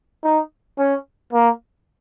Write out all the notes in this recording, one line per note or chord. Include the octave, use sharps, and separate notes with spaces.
D#4
C#4
A#3